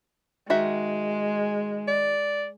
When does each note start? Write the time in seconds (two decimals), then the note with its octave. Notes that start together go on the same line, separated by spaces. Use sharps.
0.50 D#3 G#3 F#4 E5
1.88 D5